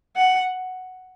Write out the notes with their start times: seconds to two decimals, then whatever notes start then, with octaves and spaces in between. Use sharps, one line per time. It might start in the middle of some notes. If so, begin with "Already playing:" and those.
0.16 F#5